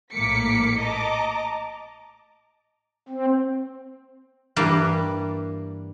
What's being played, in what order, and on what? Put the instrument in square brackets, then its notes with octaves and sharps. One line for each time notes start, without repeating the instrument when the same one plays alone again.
[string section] A#1 A2 A#3 D6 B6 C#7
D#5 A5 A#5 D6
[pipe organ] C4
[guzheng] G2 E3 G3 A#3 D4